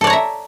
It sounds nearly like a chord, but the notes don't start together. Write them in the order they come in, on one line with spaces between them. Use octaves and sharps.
A4 D5 C#5 A#5 E5